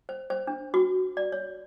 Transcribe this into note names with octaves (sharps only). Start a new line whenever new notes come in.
C5
C5
D4
F#4
D5
C#5